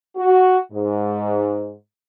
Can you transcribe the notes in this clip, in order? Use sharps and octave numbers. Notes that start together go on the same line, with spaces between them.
F#4
G#2